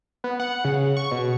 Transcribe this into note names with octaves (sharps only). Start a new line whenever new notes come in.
B3
F#5
C#3
C#6
B2